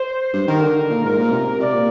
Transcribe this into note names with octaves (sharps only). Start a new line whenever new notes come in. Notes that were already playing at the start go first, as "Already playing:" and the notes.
Already playing: C5
G2
D#3 A#4
D3
A#2
G#2 A#4
A#2
C3
C3 D5
A#2